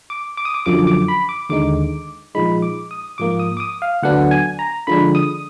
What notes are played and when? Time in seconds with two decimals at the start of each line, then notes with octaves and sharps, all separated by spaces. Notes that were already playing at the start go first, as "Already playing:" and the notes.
0.10 D6
0.37 D6
0.45 D#6
0.54 D6
0.66 F#2 D3 F3 D6
0.87 D6
1.08 B5
1.29 D6
1.49 D#2 D3 G#3 D#4 D6
2.35 A#2 F3 G#3 D#4 B5
2.62 D6
2.91 D#6
3.18 G#2 F3 A#3 D6
3.39 D#6
3.57 D6
3.60 D#6
3.82 F5
4.02 D2 D3 F#3 B3 D4 F#5
4.31 G#5
4.59 A#5
4.87 D3 F3 G#3 D4 B5
5.15 D#6